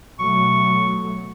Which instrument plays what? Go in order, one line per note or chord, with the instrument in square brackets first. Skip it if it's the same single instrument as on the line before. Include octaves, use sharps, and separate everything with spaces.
[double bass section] B2 F#3 A3 [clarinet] C#6